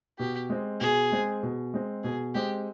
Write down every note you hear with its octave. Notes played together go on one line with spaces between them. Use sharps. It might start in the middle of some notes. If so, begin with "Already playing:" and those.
B2 G4
G#3 C4
B2 G#4
G#3 C4
B2
G#3 C4
B2 G#4
G#3 C4 G4